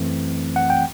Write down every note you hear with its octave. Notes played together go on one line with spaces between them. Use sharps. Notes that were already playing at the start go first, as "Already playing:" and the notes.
Already playing: F#2 E3 A3 C4
F#5
G5